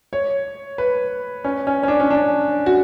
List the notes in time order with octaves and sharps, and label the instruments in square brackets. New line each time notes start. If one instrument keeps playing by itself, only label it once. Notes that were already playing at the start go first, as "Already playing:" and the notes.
[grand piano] C#5
B4
C#4
C#4
C#4
D4
C#4
D4
F#4